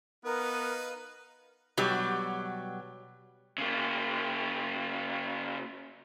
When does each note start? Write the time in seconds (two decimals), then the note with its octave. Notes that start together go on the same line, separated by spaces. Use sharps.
0.25 B3 D#4 A#4 B4 F5
1.77 B2 F#3 G3 G4
3.58 C#3 A#3